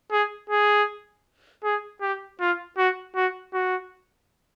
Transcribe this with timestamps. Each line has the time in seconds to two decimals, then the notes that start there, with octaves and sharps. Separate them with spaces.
0.12 G#4
0.50 G#4
1.64 G#4
2.01 G4
2.40 F4
2.78 F#4
3.15 F#4
3.53 F#4